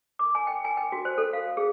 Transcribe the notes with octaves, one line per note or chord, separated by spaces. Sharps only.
D6
G#5
G5
G#5
G5
F#4
C5
A4
F5
G#4